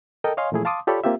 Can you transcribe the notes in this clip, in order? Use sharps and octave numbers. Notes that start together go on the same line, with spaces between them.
A4 A#4 D#5 G5
C#5 D#5 F5 G#5 C6
A#2 E3 F3 A3 E4 G#4
F5 A5 C6 D6 D#6
F4 G4 A4 C#5 D5 B5
A#3 C4 F4 G4 E5